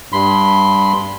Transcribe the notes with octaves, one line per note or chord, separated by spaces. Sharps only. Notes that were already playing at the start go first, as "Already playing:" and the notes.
G2 B5 C6